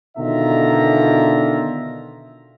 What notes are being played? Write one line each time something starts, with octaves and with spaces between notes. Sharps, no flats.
B2 D3 D#3 F4 E5 A#5